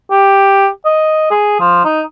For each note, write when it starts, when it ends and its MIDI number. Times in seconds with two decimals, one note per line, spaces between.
0.10 0.68 67
0.85 1.30 75
1.31 1.56 68
1.60 1.84 53
1.84 2.01 63